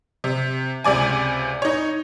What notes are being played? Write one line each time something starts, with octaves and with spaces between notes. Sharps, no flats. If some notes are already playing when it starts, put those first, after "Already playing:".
C3
C#2 C3 D5 G#5
D#4 C#5